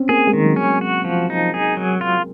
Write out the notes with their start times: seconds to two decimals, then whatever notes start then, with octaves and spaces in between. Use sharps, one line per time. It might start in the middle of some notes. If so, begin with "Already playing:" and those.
Already playing: C4 C#4
0.09 A#3 G#4
0.27 G#3
0.33 D#3
0.45 F#3
0.56 C#4
0.63 F#3
0.81 F#4
1.05 F3
1.30 D#4
1.54 G#4
1.77 F#3
2.01 F4